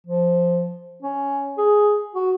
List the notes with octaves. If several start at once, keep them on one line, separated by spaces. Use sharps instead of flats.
F3
C#4
G#4
F#4